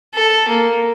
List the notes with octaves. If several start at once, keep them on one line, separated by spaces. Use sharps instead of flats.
A4
A#3